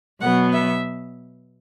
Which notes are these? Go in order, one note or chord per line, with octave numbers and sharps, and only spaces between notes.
B2 F#3 B3 F#5
E5